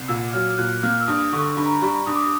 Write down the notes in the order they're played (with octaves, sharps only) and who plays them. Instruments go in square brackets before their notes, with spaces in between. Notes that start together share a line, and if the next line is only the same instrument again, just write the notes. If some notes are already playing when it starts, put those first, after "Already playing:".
Already playing: [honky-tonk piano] C2
[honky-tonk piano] A#2 [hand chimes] E6
[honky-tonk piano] F#3 [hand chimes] F6
[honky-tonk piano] A#2 [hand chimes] F#6
[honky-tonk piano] A#3 [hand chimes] F6
[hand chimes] E6
[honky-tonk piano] G2 [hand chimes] D#6
[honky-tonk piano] D3 [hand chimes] C#6
[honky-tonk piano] G2 [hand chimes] B5
[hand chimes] A#5
B5
[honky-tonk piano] G3 [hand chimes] C#6
[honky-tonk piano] G2 [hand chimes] D#6
[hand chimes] D6
D#6